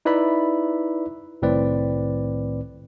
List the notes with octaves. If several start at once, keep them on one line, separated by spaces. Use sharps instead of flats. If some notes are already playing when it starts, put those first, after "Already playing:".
D#4 E4 B4 D5 E5 B5
C2 A2 D#3 C4 B4 D5